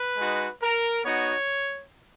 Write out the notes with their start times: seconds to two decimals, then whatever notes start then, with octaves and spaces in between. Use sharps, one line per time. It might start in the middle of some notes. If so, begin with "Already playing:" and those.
Already playing: B4
0.17 G#3 D#4 F#4
0.61 A#4
1.04 B3 D#4 F#4 C#5